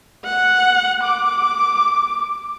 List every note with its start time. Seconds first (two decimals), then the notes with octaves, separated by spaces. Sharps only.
0.25 F#5
1.03 D6